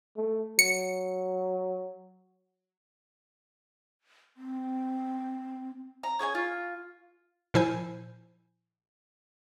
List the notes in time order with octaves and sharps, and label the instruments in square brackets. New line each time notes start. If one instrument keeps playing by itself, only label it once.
[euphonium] A3
[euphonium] F#3 [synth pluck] C#7
[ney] C4
[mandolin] A#5
C#4 G#4 G5 G#5
F4
[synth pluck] A#2 F3 E4 C5 G#5 G6